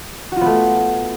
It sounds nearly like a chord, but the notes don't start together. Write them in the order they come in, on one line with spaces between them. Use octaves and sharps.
F#4 F4 B3 A3